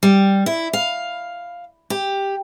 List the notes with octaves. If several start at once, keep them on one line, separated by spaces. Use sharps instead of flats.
G3
E4
F5
G4